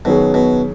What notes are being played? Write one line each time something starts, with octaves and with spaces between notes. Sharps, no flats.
B2 D#3 F#3 C#4 G#4
B2